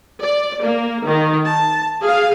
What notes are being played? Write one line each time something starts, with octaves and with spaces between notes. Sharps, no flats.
D5
A#3
D#3
A5
G#4 F5